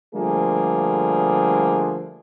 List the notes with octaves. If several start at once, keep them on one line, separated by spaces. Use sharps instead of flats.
D3 F3 G3 A3 A#3 G#4